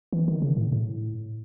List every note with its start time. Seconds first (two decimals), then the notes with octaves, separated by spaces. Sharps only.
0.13 E3
0.28 D#3
0.42 C#3
0.57 A2
0.72 A2